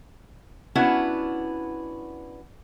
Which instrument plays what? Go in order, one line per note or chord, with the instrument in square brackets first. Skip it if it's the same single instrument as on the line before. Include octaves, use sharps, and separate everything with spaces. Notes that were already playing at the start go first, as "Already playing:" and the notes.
[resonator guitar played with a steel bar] B3 C#4 D4 E4 F#4